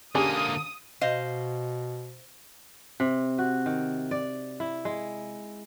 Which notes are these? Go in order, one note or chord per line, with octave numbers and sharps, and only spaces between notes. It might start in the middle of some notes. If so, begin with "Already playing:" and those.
D3 A#3 C#4 D4 G4 G#4 D#6
B2 C5 D#5 F5
C3
F#4
D#3
D5
E4
G#3